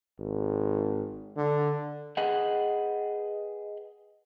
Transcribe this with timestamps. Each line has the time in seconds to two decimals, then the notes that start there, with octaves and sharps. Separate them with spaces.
0.19 G#1
1.37 D3
2.17 G#4 B4 D#5 F#5 G5